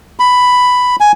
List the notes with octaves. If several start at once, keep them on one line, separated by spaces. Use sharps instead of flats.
B5
G#5